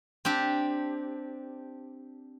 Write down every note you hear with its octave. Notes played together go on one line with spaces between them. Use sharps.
C4 D4 G4